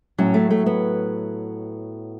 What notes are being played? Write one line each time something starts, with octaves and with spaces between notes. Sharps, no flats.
A2 F#3 C#4
A3
A3
B3